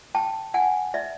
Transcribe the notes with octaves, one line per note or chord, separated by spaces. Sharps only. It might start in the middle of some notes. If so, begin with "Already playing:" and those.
G5 A5
F#5 G#5
D5 E5